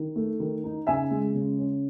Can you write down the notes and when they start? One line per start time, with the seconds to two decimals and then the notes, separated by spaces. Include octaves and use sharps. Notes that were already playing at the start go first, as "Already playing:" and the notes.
Already playing: D#3
0.16 A3
0.40 D#3
0.64 D#4
0.87 C#3 E5 G#5
1.11 G#3
1.35 C#3
1.59 C#4